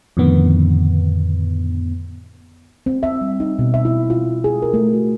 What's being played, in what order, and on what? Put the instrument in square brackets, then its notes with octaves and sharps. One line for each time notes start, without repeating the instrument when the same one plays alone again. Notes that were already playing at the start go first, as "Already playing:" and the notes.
[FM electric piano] F2 A2 D3 D#3 B3
[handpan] C4
E5
G3
D#4
B2
E5
E4
F4
G#4
A#4
A3
F#4